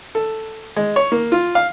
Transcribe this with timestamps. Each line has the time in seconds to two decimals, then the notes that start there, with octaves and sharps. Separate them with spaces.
0.15 A4
0.76 G#3
0.96 C#5
1.12 A#3
1.32 F4
1.55 F5